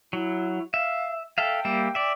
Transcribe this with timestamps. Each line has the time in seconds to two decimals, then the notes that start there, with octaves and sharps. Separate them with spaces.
0.13 F#3 E4
0.74 E5 F5
1.38 A4 E5 F5 G5
1.65 G3 A#3 E5
1.95 D5 E5